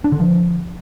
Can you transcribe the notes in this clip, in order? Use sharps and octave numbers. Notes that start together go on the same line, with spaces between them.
D4
D3
F3